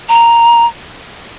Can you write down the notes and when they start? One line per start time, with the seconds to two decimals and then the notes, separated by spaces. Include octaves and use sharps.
0.09 A#5